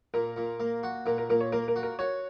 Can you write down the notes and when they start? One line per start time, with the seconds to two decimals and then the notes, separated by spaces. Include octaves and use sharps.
0.14 A#2 A#4
0.37 A#2
0.60 A#3
0.83 F#4
1.06 A#2 A#4
1.18 A#4
1.30 A#2 A#4
1.41 C#5
1.52 A#3 A#4
1.68 A#4
1.76 F#4
1.83 A#4
1.99 F#4 C#5